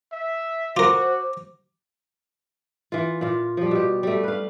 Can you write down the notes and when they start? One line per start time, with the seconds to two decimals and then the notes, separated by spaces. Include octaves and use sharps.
0.12 E5
0.77 F4 F#4 A#4 C5 D6
2.92 E3 F4
3.21 A#2 F4
3.57 F3 G3
3.71 B2 G4
4.03 G3 A3
4.23 B4 F5